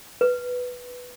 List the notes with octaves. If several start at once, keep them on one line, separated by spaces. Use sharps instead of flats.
B4